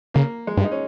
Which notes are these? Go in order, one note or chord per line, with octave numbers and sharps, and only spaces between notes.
C#3 A#3
G#3
G2
D#4
C#4